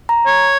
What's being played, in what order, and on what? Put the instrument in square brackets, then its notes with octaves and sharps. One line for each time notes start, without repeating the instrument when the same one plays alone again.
[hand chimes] A#5
[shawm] C#5